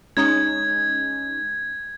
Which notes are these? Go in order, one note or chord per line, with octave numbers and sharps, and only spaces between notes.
G#3 C#4 D#4 G#6